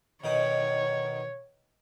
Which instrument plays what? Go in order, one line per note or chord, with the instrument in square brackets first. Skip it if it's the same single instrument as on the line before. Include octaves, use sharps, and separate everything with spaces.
[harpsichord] B2 D#3 D#4 [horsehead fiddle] C#5